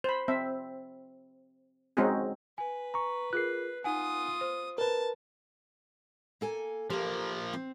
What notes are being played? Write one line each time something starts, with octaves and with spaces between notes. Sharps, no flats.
C5 B5
C4 E5
G#3 C4 C#4 D#4 F#4 G#4
B4 G#5
A#5 C#6
F4 G#4 A#4 F#6 C7
D#4 F4 F#5 G#5 D#6
C5
A#4 B4 A5
A#3 A4 G#5
F3 A#3 G4 A#4
C4